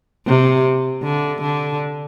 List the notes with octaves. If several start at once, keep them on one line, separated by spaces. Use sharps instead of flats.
C3
D3
D3